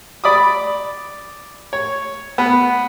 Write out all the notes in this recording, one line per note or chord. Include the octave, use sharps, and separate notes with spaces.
D5 B5 D6 D#6
C#5
B3